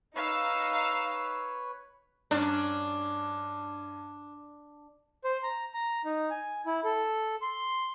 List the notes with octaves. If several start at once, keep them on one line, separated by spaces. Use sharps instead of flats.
D#4 B4 C#5 F5 E6
G2 C#4 D4
C5
A#5
A#5
D#4
G#5
E4
A4
C6